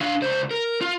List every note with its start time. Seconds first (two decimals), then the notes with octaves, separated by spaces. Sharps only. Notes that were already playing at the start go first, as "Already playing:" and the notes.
0.01 D4 F5
0.22 C#2 C5
0.51 A#4
0.81 F4